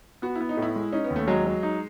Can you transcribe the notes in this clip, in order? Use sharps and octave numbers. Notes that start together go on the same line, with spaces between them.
B3 F#4
E4
B3
D#4
A2
E4
G#3
C#4 D#4
B3
D#2
A3
F#3 G#3
F#3
D#4